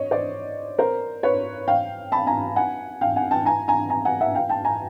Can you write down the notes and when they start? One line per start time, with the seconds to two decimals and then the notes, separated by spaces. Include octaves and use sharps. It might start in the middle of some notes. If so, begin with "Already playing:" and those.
Already playing: C#5 D#5
0.11 C5 D5
0.78 A#4 C5
1.23 B4 C#5
1.68 F5 G5
2.12 A5 B5
2.27 G#5 A#5
2.56 F#5 G#5
3.01 F5 G5
3.16 F#5 G#5
3.31 G5 A5
3.46 G#5 A#5
3.68 G#5 A#5
3.90 G#5 A#5
4.05 F#5 G#5
4.21 E5 F#5
4.35 F5 G5
4.49 G5 A5
4.64 G#5 A#5